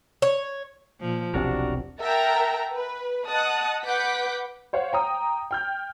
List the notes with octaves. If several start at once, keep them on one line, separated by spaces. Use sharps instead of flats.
C#5
A#2 F3
E1 B1 C3 C4 D4 F#4 G4 A#4
A#4 E5 F#5 G5 A5 A#5
B4
D#5 F#5 A5 D#6 F#6
B4 F#5 D6 G6 B6
C5 C#5 F5 F#5
G5 A#5 D#6
G5 F6 G6